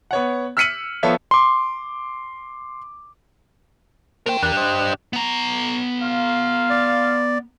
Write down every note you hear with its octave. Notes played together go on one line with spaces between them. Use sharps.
B3 C#5 F#5
E6 F6 B6 C#7 D#7 F#7
F3 B3 A4 C#5 E5 F5
C6 D6
A#3 A#4 C5 G5
E2 D4 G4 A#4
C5 D#5
B3 A#5
F4 F5
D5